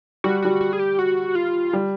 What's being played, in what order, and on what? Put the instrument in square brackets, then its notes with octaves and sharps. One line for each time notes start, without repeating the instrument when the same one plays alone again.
[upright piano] G3 [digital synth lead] F#4
[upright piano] G3 [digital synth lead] F#4
[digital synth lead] F#4
G#4
G4
F#4
F4
[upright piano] G3